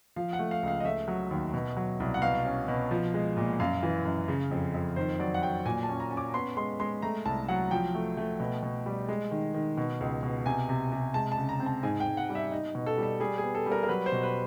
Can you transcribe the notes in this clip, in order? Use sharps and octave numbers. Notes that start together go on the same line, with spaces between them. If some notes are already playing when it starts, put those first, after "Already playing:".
F3 F5
F#5
A3
F5
C#2 F5
D#5
A3 E5
F#3
D#2
B2
F#3
C2
F#5
B2 F5
C#4
B2
F3
G#3
A#2
F#2 F5
E3
F#2
C#3
F2
F2
D#3 C5
F#3 D5
F#5
F#3 G5
A#2 G#5
A5
C#4
A#5
C#4
D6
B3 C6
G#3 C6
G#3 C6
A3 A#5
C2 A5
F#3 F#5
F3 G5
A3
A3
B2
B2
G3
G#3
D#3
D#3
B2
C#2
B2
C3 G#5
C3
C3
G#3 A5
A5
C#3
A#5
C4
A5
G#2 G#5
G5
G#2
F#5
G3
E5
D#4
B2
A4
G3
A4
G3 G#4
G#4
B3
A4
G3
A#4
A#4
F#3 B4
C5
B2
B4